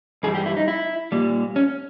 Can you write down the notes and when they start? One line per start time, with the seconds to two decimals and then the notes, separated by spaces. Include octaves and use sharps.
0.23 G2 E3 G3 G#4
0.35 G4
0.46 E4
0.57 D#4
0.68 E4
1.12 A#2 G3
1.56 C#4